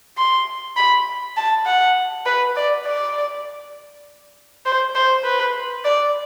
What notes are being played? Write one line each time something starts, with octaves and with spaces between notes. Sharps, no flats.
C6
B5
A5
F#5
B4
D5
D5
C5
C5
B4
D5